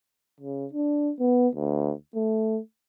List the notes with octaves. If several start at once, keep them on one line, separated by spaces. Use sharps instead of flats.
C#3
D4
B3
D2
A3